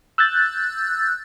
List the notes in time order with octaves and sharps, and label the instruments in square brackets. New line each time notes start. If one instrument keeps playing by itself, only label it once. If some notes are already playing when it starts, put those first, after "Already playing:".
[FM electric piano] E6 F#6 G6 A6